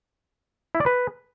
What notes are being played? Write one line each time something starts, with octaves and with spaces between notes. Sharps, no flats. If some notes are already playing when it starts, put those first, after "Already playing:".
E4
D5
B4